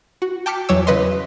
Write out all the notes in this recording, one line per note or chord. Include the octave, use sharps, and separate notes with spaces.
F#4
G5 A5 D6 F6 B6 C#7
E2 F#3 C#5 D6 E6
C#3 B4 D#5 C6